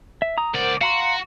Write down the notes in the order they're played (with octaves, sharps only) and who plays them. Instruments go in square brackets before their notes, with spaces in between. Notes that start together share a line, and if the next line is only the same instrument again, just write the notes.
[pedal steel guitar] E5
A#5 D#6
[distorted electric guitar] C#2 D5 [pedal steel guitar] A#4 C5 F#5
[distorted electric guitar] F#4 [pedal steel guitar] F5 A#5 C6